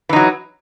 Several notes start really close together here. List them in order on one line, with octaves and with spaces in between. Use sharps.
E3 D#4 F#3